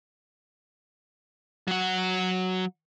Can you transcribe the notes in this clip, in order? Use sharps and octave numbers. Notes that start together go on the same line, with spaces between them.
F#3 F#5